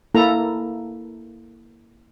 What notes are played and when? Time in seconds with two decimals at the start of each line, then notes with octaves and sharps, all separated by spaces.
0.15 A#3 E4 A4 A#5